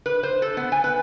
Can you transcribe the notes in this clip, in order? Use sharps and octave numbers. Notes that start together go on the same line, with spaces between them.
B4
C5
A4
B3
G#5
B4